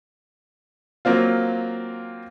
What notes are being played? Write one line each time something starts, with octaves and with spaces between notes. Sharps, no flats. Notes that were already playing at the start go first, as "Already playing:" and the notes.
F#3 A#3 C4 F4